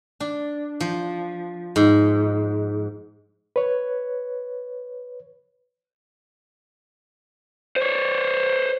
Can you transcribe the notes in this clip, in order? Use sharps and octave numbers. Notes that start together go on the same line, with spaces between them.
D4
F3
G#2
B4 C#5
C5 C#5